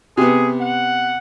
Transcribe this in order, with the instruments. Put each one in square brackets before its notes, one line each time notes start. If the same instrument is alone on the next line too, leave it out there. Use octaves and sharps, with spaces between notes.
[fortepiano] C3 B3 [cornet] G#4
[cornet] F#5